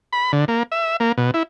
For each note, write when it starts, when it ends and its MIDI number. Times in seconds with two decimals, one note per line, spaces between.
0.13 0.32 83
0.33 0.45 50
0.48 0.63 58
0.72 0.97 76
1.00 1.12 58
1.18 1.31 47
1.34 1.43 64